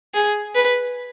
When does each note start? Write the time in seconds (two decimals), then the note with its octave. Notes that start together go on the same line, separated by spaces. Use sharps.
0.14 G#4
0.55 B4